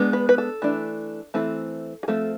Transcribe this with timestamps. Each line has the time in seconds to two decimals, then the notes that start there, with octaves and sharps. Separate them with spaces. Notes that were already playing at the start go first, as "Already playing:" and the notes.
Already playing: G#3 B3 D4
0.13 B4
0.29 B4
0.38 A4
0.62 E3 A3 D4
1.34 E3 A3 C4 A4
2.03 G#4
2.08 F3 A3 C4 A4